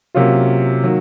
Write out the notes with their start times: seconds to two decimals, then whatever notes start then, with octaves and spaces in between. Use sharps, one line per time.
0.14 C3 F#3 A#3 C#4 F4
0.83 D#3 F#3 A#3